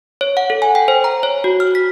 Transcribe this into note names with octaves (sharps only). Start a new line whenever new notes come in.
C#5
F#5
A4
G#5
G5
C5
A#5
C#5
F#4
F6
B6